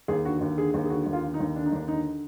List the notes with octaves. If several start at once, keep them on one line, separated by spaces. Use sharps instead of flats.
D#2 G#4
D3 F#4
D#2
D3 G#4
D#2
G#4
D3 F#4
D#2
F4
D3
D#4
D#2
D3 D4
D#4
D#2 D4
D3 D#4